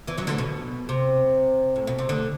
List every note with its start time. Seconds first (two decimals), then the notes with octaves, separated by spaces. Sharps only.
0.07 E2 E3
0.17 F#2 F#3
0.27 D2 D3
0.38 B2
0.89 C3
1.76 A2
1.87 B2
1.98 C3
2.09 D2 D3